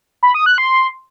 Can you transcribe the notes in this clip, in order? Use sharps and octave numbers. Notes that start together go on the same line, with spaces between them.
B5
D#6
F#6
C6